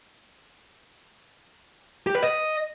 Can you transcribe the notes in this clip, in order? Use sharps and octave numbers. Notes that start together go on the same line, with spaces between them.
G4
B4
D#5